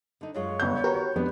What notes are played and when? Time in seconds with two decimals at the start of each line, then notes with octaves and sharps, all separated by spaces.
0.21 D3 D#4
0.35 F#2 G#3 F4 C#5
0.60 G1 G6
0.84 D#3 F#4 G4 A#4 B4 A#5
1.16 F2 G#3 B3 D4 G4